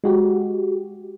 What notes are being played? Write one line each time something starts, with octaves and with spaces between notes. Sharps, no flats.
G#3 F#4 G4